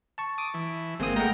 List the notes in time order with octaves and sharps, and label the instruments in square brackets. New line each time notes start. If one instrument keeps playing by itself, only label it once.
[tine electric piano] A5 C#6
[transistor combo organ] D6 D#6
E3
[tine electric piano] G1 A#3 D#6 [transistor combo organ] G#3 C4
[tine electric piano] G#3 A3 F#5 [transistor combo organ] A#4 G5 A#5